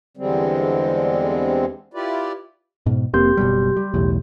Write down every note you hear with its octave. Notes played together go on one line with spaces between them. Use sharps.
E2 D3 G3 G#3 C4
E4 F4 G4 B4 D5
G#2 B2
F1 A#3 C4 G4 C6 G6
F#1 B2 G3
G3
B1 E2 A2